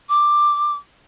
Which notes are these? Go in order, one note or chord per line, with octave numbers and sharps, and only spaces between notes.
D6